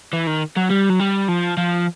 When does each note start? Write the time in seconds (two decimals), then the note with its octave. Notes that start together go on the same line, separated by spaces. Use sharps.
0.13 E3
0.27 D#3
0.56 F#3
0.70 G3
0.89 F#3
0.99 G3
1.28 F3
1.57 F3